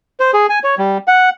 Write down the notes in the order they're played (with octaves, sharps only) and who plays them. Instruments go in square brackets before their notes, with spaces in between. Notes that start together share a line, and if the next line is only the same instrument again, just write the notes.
[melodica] C5
G#4
G#5
C#5
G3
F#5